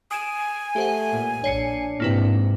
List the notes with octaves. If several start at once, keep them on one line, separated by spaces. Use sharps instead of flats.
G#5 D#6 D7 E7
A3 G4 C5 F#5
A#2
A#1 D4 C#5 C7 C#7
G#2 C3 A#3 E4 B4